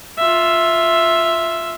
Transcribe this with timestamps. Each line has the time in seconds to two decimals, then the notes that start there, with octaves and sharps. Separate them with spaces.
0.18 F4 E5